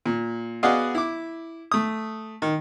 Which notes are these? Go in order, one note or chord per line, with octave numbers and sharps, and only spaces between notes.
A#2
B3 F#4 G#4 D5 D#5 F5
E4 D6
A3 D#6
D#3